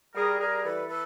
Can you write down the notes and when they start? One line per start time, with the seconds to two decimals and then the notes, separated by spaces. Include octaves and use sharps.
0.15 G3 G#4 A#4
0.39 G3 G#4 A#4
0.64 E3 A4 B4
0.89 A4 B4